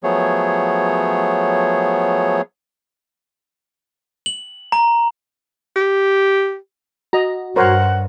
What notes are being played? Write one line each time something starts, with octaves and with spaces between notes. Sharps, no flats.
F3 F#3 A3 B3 G#4 C#5
F#7
A#5
G4
F#4 D#5 A#5
G2 A#4 C5 C#5 F#5